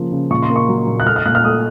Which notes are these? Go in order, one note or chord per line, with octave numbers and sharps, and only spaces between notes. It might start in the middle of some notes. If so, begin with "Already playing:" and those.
Already playing: C#3 F3 A#3
C#3
A#2 C#6
C6
A#3
C#6
F#3
A#2
F#6
A3 F6
F6
A#2 F#6
F6
A3 D#6